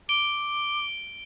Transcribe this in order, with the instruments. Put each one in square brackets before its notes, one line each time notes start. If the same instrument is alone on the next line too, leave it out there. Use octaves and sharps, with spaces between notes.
[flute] D6 [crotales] D7 G7